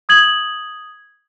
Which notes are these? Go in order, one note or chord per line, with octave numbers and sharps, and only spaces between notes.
D#6 G#6 F#7